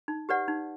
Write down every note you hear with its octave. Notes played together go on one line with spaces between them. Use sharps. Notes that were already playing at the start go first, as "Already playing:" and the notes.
D#4
G4 B4 D5 F#5
D#4